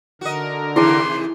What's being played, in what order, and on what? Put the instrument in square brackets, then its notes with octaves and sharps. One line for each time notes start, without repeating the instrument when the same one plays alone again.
[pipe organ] D3 A#4 [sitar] F#4 D#5
[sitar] C3 D#3 E3 [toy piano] E4 G#4 A5 [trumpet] C6